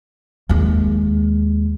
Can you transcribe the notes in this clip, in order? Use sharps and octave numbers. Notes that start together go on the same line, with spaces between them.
D#2 G#3